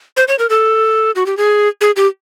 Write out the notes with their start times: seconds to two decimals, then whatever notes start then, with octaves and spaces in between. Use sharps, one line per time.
0.17 C5
0.28 C#5
0.39 A#4
0.50 A4
1.15 F#4
1.26 G4
1.37 G#4
1.81 G#4
1.96 G4